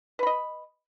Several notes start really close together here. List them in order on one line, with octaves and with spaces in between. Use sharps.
B4 B5 D#5